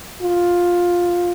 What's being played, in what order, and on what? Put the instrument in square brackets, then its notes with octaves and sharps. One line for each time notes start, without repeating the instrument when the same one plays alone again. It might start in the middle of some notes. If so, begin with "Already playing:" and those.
[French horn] F4